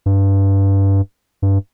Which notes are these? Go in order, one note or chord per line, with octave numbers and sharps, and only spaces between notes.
G2
G2